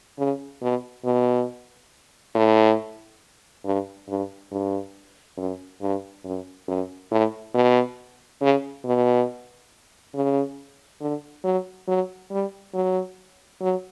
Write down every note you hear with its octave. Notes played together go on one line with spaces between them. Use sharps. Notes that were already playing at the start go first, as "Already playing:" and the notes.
C#3
B2
B2
A2
G2
G2
G2
F#2
G2
F#2
F#2
A2
B2
C#3
B2
C#3
D3
F#3
F#3
G3
F#3
F#3